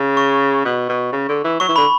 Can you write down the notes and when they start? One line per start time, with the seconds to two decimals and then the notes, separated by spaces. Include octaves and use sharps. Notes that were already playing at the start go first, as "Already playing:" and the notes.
Already playing: C#3
0.17 C#6
0.65 B2
0.89 B2
1.12 C#3
1.29 D3
1.44 E3
1.60 F#3 C#6
1.69 E3
1.76 D3 B5